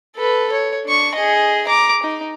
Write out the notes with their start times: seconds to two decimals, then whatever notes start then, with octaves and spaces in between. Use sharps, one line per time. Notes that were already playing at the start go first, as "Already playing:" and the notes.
0.15 A4 B4
0.52 C#5
0.85 D4 C#6
1.15 G#4 D#5
1.67 A#5 D6
2.03 D#4